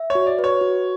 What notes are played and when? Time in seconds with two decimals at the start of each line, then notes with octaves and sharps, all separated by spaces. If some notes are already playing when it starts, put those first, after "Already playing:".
Already playing: E5
0.10 C#5
0.15 F#4
0.27 D5
0.39 B4
0.44 C#5
0.61 F#4